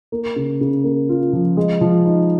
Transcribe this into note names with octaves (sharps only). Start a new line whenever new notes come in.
A#3
C#3
C#3
A#3
F4
F3
G#3
F3
D#4